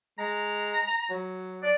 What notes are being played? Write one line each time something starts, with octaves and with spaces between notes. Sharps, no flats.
G#3 A#5
F#3
D5